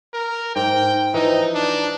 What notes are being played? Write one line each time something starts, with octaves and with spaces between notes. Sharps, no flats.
A#4
G#2 G5
E3 F3 D#4
D4